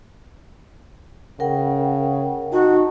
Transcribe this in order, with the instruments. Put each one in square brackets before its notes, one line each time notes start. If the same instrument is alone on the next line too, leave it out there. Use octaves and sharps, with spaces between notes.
[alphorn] C#3 [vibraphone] A#4 F#5 G5
[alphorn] D#4 [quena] F#4 [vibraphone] F#5 A5